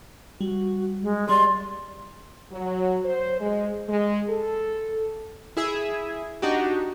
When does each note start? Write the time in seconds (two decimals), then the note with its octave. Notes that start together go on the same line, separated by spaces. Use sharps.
0.41 G3 F#4
1.02 G#3
1.29 G3 D5 D#5 C6
2.51 F#3
3.04 C5
3.40 G#3
3.87 G#3
4.28 A4
5.57 E4 G#4 E5
6.42 D4 D#4 F#4 G4